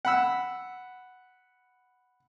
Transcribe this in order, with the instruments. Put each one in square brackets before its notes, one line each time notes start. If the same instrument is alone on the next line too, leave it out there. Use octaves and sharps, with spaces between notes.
[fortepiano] F#5 B5 E6